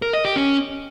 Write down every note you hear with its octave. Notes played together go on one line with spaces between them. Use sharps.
A#4
D#5
G4
C#4